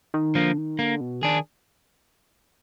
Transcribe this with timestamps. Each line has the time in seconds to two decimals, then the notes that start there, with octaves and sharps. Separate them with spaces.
0.14 D#3
0.35 D3 F3 A#3
0.58 D#3
0.79 D3 A#3
1.01 B2
1.22 D#3 D4 G#4